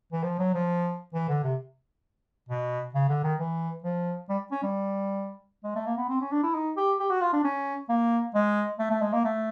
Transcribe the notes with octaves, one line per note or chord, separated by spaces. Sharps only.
E3
F3
F#3
F3
E3
D3
C3
B2
C#3
D3
D#3
E3
F3
G3
C#4
G3
G#3
A3
A#3
B3
C4
C#4
D4
E4
D#4
G4
G4
F#4
F4
D4
C#4
A#3
G#3
A3
A3
G#3
A#3
A3